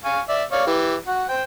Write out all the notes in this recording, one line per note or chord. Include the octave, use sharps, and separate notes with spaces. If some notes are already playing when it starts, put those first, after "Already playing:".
F5 G#5 C#6
D5 E5
C#5 D5 F5
E3 G4
F#4 F#5
C5 G5